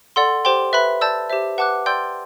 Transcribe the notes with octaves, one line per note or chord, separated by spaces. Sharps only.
A4 D5 F#5 C6
G4 C5 G5 C6
B4 E5 B5 F#6
D5 A5 E6 G6
G4 C5 E5
B4 F#5 A5 D6 F#6
D5 G5 C6 E6 G6